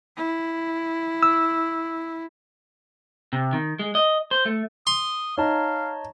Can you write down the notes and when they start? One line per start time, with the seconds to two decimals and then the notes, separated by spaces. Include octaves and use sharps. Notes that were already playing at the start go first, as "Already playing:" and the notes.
0.17 E4
1.23 E6
3.33 C3
3.53 D#3
3.79 G#3
3.95 D#5
4.31 C5
4.46 A3
4.87 C6 D#6
5.38 D#4 C#5 F5 A5 A#5